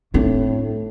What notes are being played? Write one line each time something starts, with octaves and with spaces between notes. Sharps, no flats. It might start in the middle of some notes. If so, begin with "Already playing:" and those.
A2 C4 D4